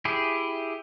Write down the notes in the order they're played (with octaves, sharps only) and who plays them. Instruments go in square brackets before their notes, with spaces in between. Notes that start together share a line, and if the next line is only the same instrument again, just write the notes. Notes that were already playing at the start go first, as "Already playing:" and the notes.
[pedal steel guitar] E4 G4 G#4